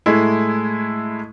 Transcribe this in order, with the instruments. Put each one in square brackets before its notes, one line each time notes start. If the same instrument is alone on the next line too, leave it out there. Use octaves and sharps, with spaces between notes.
[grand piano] A2 G#3 E4